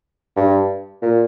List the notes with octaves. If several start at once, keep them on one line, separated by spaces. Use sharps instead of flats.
G2
A#2